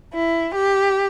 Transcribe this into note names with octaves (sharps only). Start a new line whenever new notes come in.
E4
G4